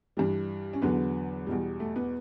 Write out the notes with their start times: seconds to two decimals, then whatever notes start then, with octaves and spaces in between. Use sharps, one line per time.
0.17 G2 E3 G3
0.73 C#4
0.82 E2 D3 F#3 B3
1.47 E2 B2 G3
1.80 A3
1.96 B3